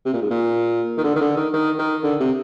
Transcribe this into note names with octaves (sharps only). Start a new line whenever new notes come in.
C3
A#2
G#2
A#2
D#3
D3
D#3
D3
D#3
D#3
D#3
D3
C3